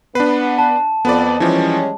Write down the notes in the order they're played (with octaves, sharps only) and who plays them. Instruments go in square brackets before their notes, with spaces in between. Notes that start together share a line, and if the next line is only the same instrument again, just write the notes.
[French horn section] B3 [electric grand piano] D4 B4 [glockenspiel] C7
[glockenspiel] A5
[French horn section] F2 [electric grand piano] B3 B4 D5
[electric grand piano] E3 F3 [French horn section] G3 G#3 C#4